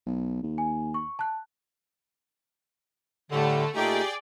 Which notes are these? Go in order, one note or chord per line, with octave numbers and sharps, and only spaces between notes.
B1
D#2
G#5
C#6
A5 F#6
A2 D3 G3 A3 A4
A#2 A3 D#4 G4 G#4 D5 G5